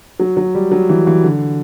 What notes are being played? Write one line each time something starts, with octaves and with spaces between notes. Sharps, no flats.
F#3
F#3
G3
F#3
E3
E3
D3